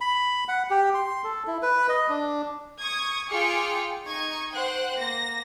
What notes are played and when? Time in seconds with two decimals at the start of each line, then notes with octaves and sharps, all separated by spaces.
0.01 B5
0.48 F#5
0.71 G4
0.94 C6
1.24 A4
1.47 E4
1.62 B4
1.89 D#5
2.09 D4
2.79 C#6 D#6 G#6
3.29 F4 G#4 G5 D6 F6 C#7
4.06 D#4 C#6 G#6
4.51 C5 F#5 G5 F#6
4.96 A#3 A#6